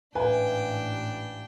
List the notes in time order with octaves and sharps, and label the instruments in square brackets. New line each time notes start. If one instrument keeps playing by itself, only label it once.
[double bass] A1 G#2 [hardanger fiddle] D4 G5 [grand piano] B4 [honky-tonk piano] E5 F5 G#5